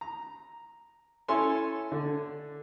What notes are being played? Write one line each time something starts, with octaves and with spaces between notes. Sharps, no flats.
A#5
C#4 E4 A4 C#5 G#5 C6
D3